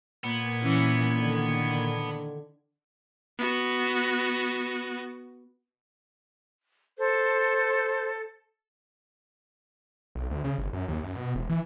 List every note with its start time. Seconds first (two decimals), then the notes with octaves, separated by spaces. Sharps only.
0.24 A#2 B3 G#6
0.62 E3 C#4
1.16 D3 D#3
3.39 B3 F#4
6.98 A4 C5
10.15 B1
10.30 D2
10.44 C#3
10.58 G1
10.73 F#2
10.88 D#2
11.03 F#2
11.15 B2
11.35 E1
11.50 E3